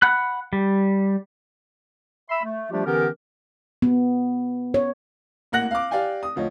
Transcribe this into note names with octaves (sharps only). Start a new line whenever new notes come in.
F#5 B5 F#6
G3
E5 B5 C6 E6
A3
F3 G3 A3 D4 F4 G4
D3 E3 B3 C#4 G4 A#4
B3
C#5
A1 A#3 F#5 F#6 A#6 F#7
F5 D6
G4 D5 F5 G5 G#5
D#6
D2 F3 C#5 D#5